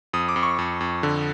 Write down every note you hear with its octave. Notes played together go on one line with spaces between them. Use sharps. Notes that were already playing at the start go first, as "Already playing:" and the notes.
F2 D#6
D6
F2
C#6
F2
F2
D3